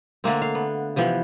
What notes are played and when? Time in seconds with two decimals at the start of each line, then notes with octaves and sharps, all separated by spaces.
0.24 D3 A3 A#3 C4
0.42 F5
0.55 B3
0.96 C3 E3 F3 B3